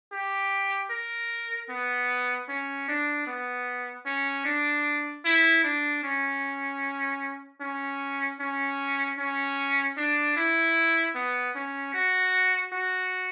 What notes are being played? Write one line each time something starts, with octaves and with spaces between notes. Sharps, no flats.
G4
A#4
B3
C#4
D4
B3
C#4
D4
E4
D4
C#4
C#4
C#4
C#4
D4
E4
B3
C#4
F#4
F#4